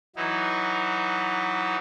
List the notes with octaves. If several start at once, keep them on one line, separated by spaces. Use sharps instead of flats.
E3 F#3 D#4 E4